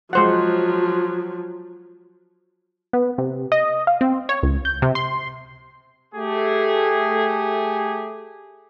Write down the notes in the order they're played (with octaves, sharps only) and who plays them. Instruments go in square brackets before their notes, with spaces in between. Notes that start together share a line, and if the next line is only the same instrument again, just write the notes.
[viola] F3 F#3 [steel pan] G#3 C5 F#5
[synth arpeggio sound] B3
C3
D#5
F5
C4
C#5
C#2
G6
C3
C6
[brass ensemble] A3 G4 G#4